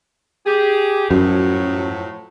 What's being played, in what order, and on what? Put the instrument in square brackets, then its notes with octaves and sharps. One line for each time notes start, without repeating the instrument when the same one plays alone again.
[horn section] G4 G#4
[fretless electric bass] F#2 [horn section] A2 F3 F#3